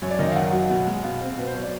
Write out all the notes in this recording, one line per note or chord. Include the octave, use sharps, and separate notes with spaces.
F#2 C#5
D5
D#3 D#5
E5
F5
F#2 F#5
F#3
B2
G#3
B2 F5
C4
B2 B4
C5
F#3 C#5
D5